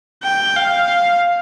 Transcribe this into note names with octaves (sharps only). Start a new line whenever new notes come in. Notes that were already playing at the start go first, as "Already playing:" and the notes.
G5
F5